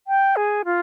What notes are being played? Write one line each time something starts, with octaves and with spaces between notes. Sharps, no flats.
G5
G#4
F4